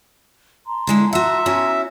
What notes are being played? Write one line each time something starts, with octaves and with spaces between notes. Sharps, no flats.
A5 A#5 C6
D3 G#3 E4
F#4 E5 F#5
C#4 E4 F#4